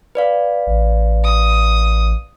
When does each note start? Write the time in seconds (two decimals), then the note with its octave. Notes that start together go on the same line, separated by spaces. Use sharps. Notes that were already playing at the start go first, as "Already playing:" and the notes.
0.15 B4 D5 F5
0.67 A1
1.24 D#6